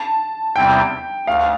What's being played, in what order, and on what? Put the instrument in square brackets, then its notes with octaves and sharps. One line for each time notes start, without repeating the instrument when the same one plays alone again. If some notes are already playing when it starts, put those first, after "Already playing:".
Already playing: [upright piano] A5
[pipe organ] E2 C3 G3 C4 E4 [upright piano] G5
[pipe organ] D2 [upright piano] F5